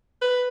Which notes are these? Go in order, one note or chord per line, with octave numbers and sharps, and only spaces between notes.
B4